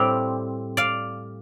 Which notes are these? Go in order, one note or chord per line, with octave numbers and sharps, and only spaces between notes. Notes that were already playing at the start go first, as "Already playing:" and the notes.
Already playing: A2 G3 C4 D5 F5
D5 F5